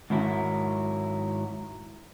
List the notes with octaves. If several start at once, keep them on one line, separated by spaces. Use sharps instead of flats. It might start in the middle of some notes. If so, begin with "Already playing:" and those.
G#2 D#3 F#3 E4